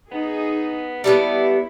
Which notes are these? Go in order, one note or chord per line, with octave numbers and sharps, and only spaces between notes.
B3 D#4 G#4
G3 A3 B3 E4 D5